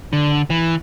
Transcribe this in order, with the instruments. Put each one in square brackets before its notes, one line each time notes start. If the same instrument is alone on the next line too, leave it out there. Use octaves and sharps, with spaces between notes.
[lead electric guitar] D3
E3